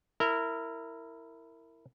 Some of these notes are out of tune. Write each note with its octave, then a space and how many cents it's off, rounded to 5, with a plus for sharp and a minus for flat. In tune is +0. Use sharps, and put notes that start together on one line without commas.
E4 +0 A#4 -20